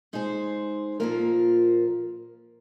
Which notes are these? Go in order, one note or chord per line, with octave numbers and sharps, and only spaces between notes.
G#3 D#4 G#4 C5
A#2 F3 A#3 F4 A#4